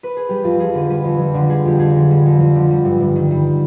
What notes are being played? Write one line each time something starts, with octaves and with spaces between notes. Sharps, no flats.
B4
G#4
G3 G4
F2 F4
F2 G#4
D3 B4
G3 B4
F2
F2
D3
G3 G#4
F2 G4
F2 G#4
D3
G3
F2
F2
D3
G3
G2
G2
D#3
G3